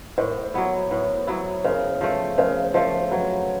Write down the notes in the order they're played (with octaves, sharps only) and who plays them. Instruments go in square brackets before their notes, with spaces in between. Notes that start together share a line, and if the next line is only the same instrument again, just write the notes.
[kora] A2 [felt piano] A#4 C5
[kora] F#3 B3 E4
[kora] A2 [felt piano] B4 C#5
[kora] F#3 B3 E4
[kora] C#3 [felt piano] A#4 C5
[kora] F3 A3 [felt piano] B4 C#5
[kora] C#3 [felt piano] A#4 C5
[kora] F3 A3 [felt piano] A#4 C5
[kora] F#3 [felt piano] A4 B4